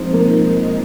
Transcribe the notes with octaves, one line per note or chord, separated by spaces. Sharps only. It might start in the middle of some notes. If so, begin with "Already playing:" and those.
Already playing: F3 G#3 C4 D#4 C5
A#3 A#4